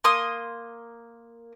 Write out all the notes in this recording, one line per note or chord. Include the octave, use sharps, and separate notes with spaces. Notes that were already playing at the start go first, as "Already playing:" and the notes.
A#3 C6 D#6